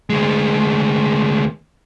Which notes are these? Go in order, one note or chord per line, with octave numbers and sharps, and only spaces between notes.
D2 G#3